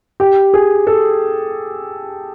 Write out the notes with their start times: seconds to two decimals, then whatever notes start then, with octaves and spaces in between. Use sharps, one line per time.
0.20 G4
0.54 G#4
0.87 A4